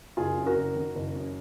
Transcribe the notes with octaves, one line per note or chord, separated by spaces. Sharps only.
F#1 F4 G#4
F#2
F#4 A#4
F#1
D#3
F#1
F#2